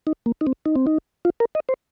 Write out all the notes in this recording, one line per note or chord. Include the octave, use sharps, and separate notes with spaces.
D#4
A#3
D#4
C4
D#4
C4
D#4
F4
A#4
D#5
C5